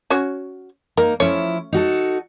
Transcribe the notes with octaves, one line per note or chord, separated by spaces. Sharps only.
C#4 F#4 C#5
A#3 D#4 A#4
F3 A3 C#4 E4 C#5
D#4 F#4 A4